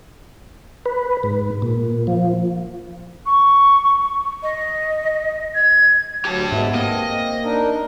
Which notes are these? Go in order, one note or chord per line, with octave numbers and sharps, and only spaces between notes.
B4
G#2
A#2
F3
C#6
D#5
G#6
D2 F#3 G4 A5
G#2 G#3 B3 E5
A#3 C4 D#5
D4 D#4 A#4